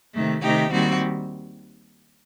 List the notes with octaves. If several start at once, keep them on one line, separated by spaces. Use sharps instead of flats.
C3 D#3 A3
C3 D#3 A3 D#4 G4
D#2 D#3 G3 C4 F#4